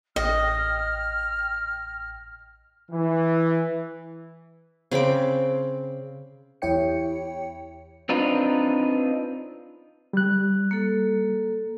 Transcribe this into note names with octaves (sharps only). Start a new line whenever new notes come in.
A1 D#5 G5 F6 A#6
E3
C#3 C4 B5 D6
E2 E4 G4 C#5 G5 C#7
C4 D4 D#4 F4 B4
G3 F#6
A#3 A4